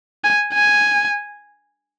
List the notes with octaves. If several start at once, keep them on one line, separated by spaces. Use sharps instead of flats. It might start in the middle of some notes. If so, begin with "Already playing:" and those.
G#5
G#5